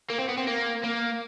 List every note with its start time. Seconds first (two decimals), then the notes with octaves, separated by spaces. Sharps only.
0.10 A#3
0.19 C4
0.29 B3
0.38 C4
0.47 A#3
0.84 A#3